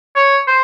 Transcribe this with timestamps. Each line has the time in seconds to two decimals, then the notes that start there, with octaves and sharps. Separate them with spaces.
0.15 C#5
0.47 C5